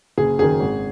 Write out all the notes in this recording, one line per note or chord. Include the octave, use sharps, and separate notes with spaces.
F#1 G#4
F#2 D#3 G#4
G#1